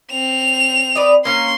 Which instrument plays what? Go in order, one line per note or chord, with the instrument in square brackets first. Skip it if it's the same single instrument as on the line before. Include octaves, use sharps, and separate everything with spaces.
[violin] C4 F7
[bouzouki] B4 D5 D#5
[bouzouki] A#3 C#4 [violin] C6